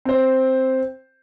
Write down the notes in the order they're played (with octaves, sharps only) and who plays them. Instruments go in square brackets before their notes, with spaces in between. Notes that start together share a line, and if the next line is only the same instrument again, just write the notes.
[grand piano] C4 C5